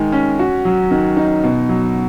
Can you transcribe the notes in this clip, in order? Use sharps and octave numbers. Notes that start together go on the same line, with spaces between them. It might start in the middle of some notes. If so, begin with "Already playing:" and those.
Already playing: D#3 G#3
C#4
F#4
F#3
D#3
D#4
B2
F#3